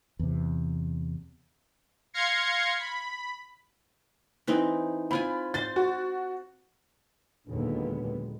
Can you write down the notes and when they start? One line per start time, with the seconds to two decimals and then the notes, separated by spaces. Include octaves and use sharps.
0.19 E2 C3
2.14 F5 C6 G#6 A#6 C7 C#7
2.79 B5
4.47 E3 C4 D#4
5.11 C4 F4 G#5 B5
5.54 C5 C6 A6
5.76 F#4
7.49 D#2 A#2 D3 F#3 G#3 B3